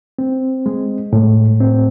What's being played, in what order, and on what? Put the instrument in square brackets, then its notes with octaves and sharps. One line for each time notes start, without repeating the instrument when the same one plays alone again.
[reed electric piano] C4
G#3
A2
C4